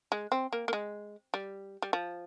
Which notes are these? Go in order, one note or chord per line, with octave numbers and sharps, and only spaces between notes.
G#3
C4
A#3
A#3
G#3
G3
G3
F3